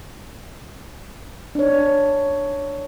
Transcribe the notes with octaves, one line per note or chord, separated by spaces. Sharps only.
D4 C#5